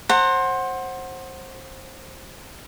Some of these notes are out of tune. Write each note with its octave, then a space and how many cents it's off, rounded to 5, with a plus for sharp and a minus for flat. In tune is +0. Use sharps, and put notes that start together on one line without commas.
C5 +20 F#5 +0 A#5 -40